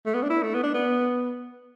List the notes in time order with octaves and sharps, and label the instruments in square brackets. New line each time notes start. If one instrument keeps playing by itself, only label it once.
[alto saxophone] A3
B3
D4
E4
A3
B3
D4
B3